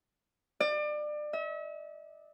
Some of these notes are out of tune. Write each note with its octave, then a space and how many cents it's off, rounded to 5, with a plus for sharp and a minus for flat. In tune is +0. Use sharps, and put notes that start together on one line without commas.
D5 +30
E5 -40